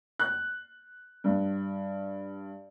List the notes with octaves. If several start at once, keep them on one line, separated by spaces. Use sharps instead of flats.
F#6
G2